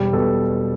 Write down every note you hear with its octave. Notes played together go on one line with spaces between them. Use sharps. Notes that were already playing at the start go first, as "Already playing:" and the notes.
Already playing: E1 G3
B2 A4